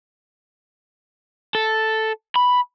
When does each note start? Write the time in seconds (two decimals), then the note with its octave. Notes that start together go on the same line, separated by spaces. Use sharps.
1.55 A4
2.36 B5